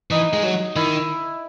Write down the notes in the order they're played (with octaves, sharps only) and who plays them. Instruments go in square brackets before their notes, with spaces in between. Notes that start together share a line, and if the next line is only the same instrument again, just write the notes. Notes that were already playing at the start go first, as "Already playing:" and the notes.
[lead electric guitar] E3 [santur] D#4
[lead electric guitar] G#3
F#3
[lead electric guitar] D#3 [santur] E4